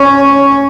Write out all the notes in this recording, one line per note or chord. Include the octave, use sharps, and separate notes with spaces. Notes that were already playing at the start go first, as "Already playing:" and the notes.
Already playing: C#4